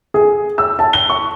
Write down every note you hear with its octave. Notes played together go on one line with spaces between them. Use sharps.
G#4
E6
A5
G7
C#6